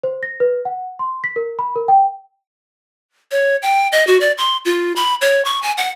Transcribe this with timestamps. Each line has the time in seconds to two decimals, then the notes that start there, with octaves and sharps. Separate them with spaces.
0.03 C5
0.23 A#6
0.40 B4
0.65 F#5
0.99 C6
1.24 B6
1.36 A#4
1.59 B5
1.76 A#4
1.88 G5
3.31 C#5
3.62 G5
3.92 D#5
4.07 F#4
4.20 D5
4.38 C6
4.65 F4
4.96 B5
5.21 C#5
5.45 C#6
5.62 G#5
5.78 F#5